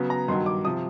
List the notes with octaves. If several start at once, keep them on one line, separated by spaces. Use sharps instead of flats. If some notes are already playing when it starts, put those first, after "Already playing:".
Already playing: C#3 F#3 B3
A#5
G2 D#3 F#3 C6
D6
C3 F3 D#6